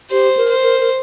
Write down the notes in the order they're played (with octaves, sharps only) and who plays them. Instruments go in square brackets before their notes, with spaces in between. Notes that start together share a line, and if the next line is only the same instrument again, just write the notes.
[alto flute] G4 [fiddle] C5
[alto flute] A#4
[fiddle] C5
[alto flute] A#4
A#4